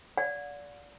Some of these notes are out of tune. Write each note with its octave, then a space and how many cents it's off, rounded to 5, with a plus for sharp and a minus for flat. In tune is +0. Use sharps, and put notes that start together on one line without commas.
D5 -25 F#5 -40